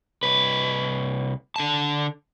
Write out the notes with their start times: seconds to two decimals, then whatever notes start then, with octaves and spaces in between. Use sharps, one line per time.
0.23 C2 B4
1.56 D3 A5